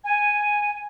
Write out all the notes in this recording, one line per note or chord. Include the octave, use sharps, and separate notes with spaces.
G#5